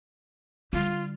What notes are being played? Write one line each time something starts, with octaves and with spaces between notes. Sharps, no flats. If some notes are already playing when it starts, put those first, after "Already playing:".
D3 G3 F4